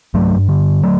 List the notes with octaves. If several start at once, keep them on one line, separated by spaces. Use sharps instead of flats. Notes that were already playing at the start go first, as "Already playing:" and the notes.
G2 F#3 A3
D3
F#3 A3